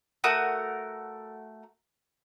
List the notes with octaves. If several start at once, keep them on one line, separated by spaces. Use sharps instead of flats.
A3 F#4 A#4 D#6